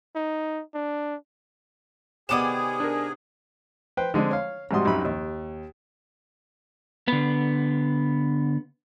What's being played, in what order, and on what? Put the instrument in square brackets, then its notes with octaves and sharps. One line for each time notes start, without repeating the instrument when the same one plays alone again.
[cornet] D#4
D4
[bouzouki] C3 D#3 D5 [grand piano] B3 D6 E7 [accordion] G#4
[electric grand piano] D4 A#4
[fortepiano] B4 C5 G5
D3 G#3 C4 D4
C#5 F5
G#2 C3 G3 F#4 C6 D#6
C2 F#2 D#4 B5
D#2
[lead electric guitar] D3 B3